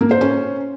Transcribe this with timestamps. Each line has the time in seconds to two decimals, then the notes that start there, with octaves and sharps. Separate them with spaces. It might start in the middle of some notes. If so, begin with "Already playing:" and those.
0.01 A#3
0.11 C5
0.21 C#4